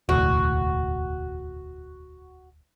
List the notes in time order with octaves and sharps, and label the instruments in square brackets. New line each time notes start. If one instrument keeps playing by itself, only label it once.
[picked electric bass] E1 D2 A2 [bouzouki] F#4